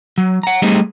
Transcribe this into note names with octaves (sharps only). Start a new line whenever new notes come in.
F#3
F#5 A#5
G3 A3 C4 D#4 G4 G#4